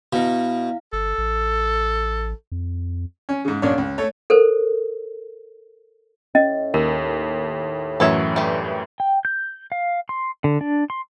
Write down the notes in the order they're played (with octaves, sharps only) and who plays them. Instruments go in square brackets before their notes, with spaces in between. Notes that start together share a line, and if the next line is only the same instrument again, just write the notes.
[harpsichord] B2 [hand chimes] E4 F5
[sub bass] G1 [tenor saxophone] A4
[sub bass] A1
F2
[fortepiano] C#4
G#2 C#3
A#1 F#2 D4 C#5
C#2
A3 A4 C#5
[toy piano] A4 A#4 C5
[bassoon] A2 [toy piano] C#4 D#5
[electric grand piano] D#2 [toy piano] A#4
[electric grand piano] F#2 A2 E3 [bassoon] F#3 [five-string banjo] A4 C#5 E5
[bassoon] G2 [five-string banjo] G3 A3
[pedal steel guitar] G5
G6
F5
C6
D3
D4
C6